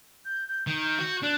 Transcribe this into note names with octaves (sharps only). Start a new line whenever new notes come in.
G6
G6
D#3 G6
G6
F#4
D4 F#6